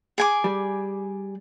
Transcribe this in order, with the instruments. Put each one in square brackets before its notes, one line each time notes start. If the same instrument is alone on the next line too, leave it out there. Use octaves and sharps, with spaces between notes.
[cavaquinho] G#4 G#5 D6
[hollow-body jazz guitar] G3